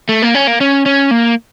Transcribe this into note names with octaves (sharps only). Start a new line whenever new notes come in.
A3
A#3
C#4
A#3
C#4
C#4
A#3